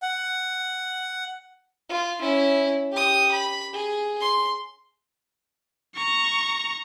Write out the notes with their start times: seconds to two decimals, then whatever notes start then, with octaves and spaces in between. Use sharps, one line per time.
0.02 F#5
1.89 F4
2.21 C#4 E4
2.92 G4 D#6
3.32 B5
3.73 G#4
4.21 C6
5.95 A#5 C#6